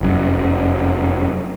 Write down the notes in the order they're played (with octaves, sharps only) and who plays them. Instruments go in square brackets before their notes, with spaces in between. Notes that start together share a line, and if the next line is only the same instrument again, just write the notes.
[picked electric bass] F1 F#2